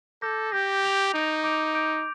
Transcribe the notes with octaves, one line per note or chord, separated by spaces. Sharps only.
A4 D6 G6 A#6
G4 D6 G6 A#6
G6 D7 F7
D#4 G6 D7 F7
D6 G6 D7 F7
D6 G6 D7 F7